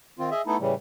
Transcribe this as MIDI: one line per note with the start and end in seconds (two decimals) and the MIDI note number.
0.19 0.30 51
0.19 0.30 60
0.19 0.30 65
0.31 0.42 68
0.31 0.42 75
0.31 0.42 76
0.46 0.57 57
0.46 0.57 59
0.46 0.57 63
0.46 0.57 64
0.46 0.57 69
0.60 0.74 45
0.60 0.74 49
0.60 0.74 52
0.60 0.74 55